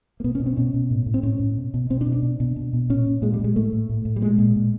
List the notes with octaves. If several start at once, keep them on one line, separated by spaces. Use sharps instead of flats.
A#3
B2 B3
C#4
B2
C4
B2 C#4
B2
A2
A2
C4
A2 C#4
A2
B2
B2
B2 C4
D4
B2
D4
B2
B2
B2
B2
A#2 C#4
A#2
A#2 G#3
G3
A#2 G#3
A2 A3
A2
A2
A2
G3
A#2 G#3
A#2
A#2